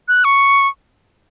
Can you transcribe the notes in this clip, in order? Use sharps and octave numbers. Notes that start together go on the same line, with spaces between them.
F#6
C#6